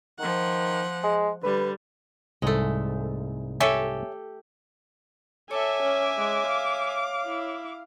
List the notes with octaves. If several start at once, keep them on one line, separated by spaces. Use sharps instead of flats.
D#3 F3 F#5
G#3
D3 G3 B4
C2 G#2 G#3 A3
G4 A4 C#5 E5 G#5
A4 C#5 E5 G#5 D6
C#4
G#3
F5
E4